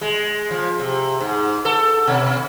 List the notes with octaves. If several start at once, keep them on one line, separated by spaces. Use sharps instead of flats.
G#3
F3
C3
G#2
A4
B2